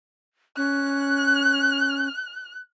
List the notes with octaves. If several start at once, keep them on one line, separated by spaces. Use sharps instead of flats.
C#4 F#6